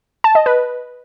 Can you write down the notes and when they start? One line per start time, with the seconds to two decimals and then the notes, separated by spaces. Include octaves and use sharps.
0.24 A5
0.35 D#5
0.46 B4